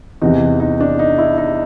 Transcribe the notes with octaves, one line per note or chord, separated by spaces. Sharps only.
E2 C3 E3 D#4
D#4
D4
D#4
E4
D#4